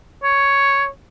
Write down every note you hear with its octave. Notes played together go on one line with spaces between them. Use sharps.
C#5